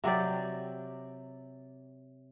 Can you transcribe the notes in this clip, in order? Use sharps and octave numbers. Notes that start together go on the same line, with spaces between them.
C3 F#3 G4 D5